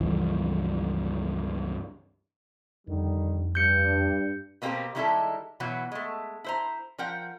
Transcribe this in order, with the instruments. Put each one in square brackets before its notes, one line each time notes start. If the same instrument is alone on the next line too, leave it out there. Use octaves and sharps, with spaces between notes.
[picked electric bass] C#2 G2 E3 F3
[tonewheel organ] F2 [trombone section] D3 D#3 G3
[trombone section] G2 [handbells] G6 C#7
[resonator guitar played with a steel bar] B2 A#3 C4 C#4 G4 A#4
D#3 G3 G#3 E4 G4 A4
B2 E3 F#3 F#4
G#3 A3
E4 C5 A#5
F3 A#4 F#5 G5